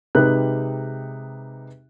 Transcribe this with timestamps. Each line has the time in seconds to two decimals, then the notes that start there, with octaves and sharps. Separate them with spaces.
0.15 C3 G#3 D#4 G4 B4 F#6